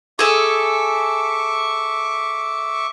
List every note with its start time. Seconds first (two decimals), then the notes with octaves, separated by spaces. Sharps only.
0.19 G#4 A4 E5 C#6 D6